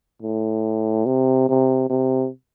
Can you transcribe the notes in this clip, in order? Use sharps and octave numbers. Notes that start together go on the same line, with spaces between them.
A2
C3
C3
C3